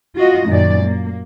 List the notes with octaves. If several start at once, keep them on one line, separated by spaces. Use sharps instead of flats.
F4 F#4 D#5
F#2 A#2 D#3 D5
A#3